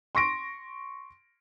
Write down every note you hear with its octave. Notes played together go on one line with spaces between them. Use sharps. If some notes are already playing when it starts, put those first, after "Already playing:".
C6 C#6 A#6 D7